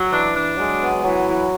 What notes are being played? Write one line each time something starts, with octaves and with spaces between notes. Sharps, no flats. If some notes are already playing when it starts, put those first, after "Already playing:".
Already playing: F#3
E3 D4
D4
F#3 G#3
B3
E3 F#3
E3